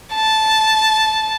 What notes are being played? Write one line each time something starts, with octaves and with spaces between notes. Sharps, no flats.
A5